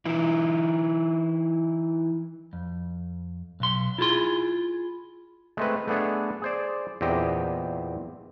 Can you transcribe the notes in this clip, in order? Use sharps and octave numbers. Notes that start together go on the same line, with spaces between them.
E3 D#4 E4
F2
B1 C6
E4 F4 G#4 C6
G#3 A3 C4 B4
A3 B3 D4 G#4 A4
G#4 C5 D5
E2 A#2 C4 G4 D#5 E5